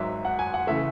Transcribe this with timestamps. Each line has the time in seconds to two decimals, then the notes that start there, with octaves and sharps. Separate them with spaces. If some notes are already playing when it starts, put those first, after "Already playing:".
Already playing: G#1 G#2 F#3 E5
0.25 F#5
0.39 G#5
0.54 F#5
0.67 C#3 E3 A3 E5